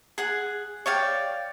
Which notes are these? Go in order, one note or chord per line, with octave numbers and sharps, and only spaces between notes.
G#4 F#5
C#5 D5 F5 G5